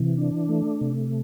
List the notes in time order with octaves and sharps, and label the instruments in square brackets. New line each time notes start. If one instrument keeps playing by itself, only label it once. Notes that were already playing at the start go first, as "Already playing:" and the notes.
Already playing: [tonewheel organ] C3 E3
D4
A3
C3